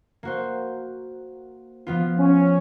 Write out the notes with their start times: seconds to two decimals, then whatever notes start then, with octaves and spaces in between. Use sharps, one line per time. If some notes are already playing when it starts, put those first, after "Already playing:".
0.23 A#3 F#4 C5
1.87 F3 B3 F4
2.19 C#4